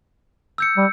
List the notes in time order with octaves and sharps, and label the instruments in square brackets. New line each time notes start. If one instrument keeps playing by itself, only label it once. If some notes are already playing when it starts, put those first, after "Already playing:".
[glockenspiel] E6 G6 C#7
[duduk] G3